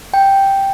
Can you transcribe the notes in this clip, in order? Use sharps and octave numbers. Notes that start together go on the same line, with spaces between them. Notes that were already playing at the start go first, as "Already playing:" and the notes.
G5